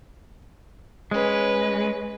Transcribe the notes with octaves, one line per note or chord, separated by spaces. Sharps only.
G#3 C#4 B4